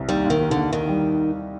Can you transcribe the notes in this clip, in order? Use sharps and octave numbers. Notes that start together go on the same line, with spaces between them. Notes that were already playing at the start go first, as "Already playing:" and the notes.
Already playing: C2
D#2 G3
D#2 D#3
D#2
D#2 D3
D#2 D#3
G3